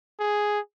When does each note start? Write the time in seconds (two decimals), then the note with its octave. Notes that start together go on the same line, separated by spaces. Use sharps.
0.20 G#4